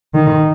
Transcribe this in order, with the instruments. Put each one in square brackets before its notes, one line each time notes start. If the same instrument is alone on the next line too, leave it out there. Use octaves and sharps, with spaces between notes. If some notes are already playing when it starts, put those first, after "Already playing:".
[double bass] D#3